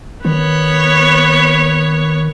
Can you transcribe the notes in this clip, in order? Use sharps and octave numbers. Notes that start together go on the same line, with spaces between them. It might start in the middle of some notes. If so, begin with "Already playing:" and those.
D#3 B3 C#5